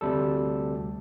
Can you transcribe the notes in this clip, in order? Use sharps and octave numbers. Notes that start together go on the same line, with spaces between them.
D2 C3 G3 A4